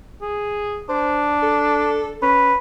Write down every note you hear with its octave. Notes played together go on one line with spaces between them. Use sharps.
G#4
D4 C5
A4
C#4 B4